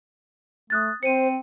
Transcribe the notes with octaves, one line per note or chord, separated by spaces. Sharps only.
A3 D#6 F#6 A6
C4 C5 C#7 D#7